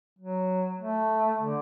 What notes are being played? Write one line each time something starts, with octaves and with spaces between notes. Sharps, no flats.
F#3
A3
D3